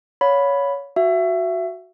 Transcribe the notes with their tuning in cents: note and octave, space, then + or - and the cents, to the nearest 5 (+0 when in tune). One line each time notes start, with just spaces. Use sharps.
C#5 +15 F5 +30 B5 +0
F#4 +0 E5 +25